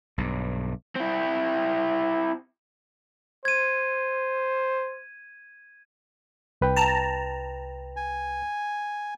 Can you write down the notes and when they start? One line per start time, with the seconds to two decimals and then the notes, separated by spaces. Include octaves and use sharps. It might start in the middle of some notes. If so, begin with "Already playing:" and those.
0.18 B1 G2
0.95 C4 E4
3.45 C5 G#6 D#7
6.61 C2 B4 G5
6.76 A5 A#5
7.96 G#5